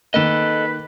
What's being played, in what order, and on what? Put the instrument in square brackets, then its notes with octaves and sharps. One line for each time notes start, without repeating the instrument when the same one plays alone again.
[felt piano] D#3 A#3 [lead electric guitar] A4 D#5 [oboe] B4